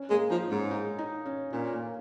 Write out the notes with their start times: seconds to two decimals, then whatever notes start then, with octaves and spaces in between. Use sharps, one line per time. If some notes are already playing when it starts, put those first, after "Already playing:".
Already playing: C#4
0.10 G#3 A#3
0.30 F3 D#4
0.50 G#2 C#4
0.71 D#4
0.99 D#4
1.26 C#4
1.53 A#2 C#4
1.72 A#3